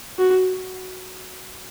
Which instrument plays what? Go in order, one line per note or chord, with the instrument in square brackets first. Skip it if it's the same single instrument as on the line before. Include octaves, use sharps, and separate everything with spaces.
[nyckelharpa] F#4